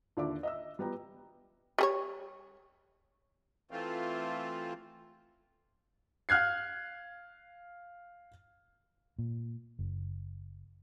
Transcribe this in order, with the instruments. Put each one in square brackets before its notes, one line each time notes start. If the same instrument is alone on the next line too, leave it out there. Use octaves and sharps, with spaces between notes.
[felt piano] D#2 D3 D5 E5 D6
D#5 E5 E6
G3 B3 G5 A#5
[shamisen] G3 G#4 C#5
[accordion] E3 A3 C4 F4
[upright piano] F5 F6 F#6 G#6 C7
[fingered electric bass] A#2
F#1